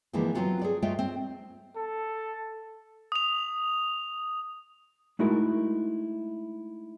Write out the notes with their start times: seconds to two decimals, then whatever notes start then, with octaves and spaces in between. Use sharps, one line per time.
0.13 D3 E3 F3 G#3 A#3 C4
0.35 F#3 G3 B3 C4 F4 F#4
0.61 G#4 A4 D5
0.82 G#3 A3 F4 C#5 D#5 G5
0.99 C4
1.77 A4
3.12 D#6 F7
5.19 G#3 A3 D#4 E4 F#4 A#4